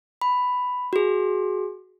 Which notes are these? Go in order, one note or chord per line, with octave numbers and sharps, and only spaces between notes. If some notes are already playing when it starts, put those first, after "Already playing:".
B5
F#4 G#4